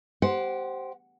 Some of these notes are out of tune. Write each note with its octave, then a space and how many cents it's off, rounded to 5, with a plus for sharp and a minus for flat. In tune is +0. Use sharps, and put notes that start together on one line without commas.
G4 -20 C5 +0 F#5 +0